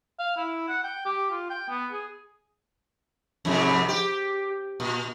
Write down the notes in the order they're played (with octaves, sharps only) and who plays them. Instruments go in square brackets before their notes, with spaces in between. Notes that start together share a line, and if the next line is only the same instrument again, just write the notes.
[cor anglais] F5
E4
F#5
G5
G4
F4
G5
B3
G#4
[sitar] F2 G#2 C3
G4
A#2